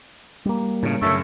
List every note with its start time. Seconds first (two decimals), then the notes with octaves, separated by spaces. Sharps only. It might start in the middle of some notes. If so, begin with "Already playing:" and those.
0.46 G3 A#3
0.83 A2 C#3
1.02 F#2 C#3 A3